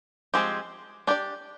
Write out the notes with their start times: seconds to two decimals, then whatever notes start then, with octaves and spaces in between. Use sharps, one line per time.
0.34 F3 G#3 C4 G4
1.07 D4 G4 D5